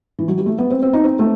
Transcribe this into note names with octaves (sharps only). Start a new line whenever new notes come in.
E3
F#3
G3
A3
B3
C4
C4
D#4
C4
A3